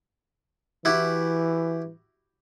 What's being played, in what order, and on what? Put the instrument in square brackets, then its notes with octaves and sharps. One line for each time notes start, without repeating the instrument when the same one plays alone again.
[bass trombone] E3 [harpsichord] E4 F#4 G4